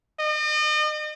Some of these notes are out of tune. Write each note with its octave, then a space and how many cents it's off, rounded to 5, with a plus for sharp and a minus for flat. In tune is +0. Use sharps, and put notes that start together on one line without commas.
D#5 -40